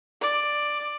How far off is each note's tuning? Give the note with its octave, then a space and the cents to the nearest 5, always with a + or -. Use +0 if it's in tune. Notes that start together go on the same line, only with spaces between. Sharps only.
D5 +5